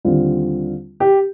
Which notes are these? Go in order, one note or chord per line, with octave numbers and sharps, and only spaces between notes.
D#2 D3 G3 C4 F4
G4